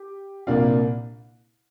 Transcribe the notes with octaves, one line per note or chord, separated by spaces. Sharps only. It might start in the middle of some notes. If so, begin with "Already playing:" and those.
Already playing: G4
C2 A#2 A#3 D4 F4 F5